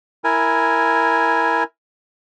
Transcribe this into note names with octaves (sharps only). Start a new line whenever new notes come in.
E4 A#4 G#5